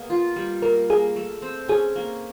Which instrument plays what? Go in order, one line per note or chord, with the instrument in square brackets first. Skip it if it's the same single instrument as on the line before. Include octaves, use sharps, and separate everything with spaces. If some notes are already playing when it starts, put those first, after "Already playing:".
Already playing: [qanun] A#3 B3 G#4
F4
G3
[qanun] A#3 [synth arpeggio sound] A#4
[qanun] A#3 [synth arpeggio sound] G#4
[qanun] A3
C4
[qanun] C#4 [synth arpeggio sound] G#4
[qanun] A#3